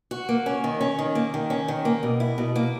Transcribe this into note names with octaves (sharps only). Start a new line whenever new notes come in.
F#4
A#3
C#4
D#3
C#4
D#3
A#3
D#3
C#4
D#3
A#3
B2
E4
B2
A#3